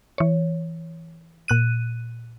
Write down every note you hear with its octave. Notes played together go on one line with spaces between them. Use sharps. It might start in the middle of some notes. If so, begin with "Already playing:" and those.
E3 C#5
A#2 F#6 D#7